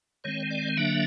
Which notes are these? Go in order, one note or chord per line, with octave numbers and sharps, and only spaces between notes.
D#3 G#3 C4 C#5
D5
D3 F#3 A#3 D4 E5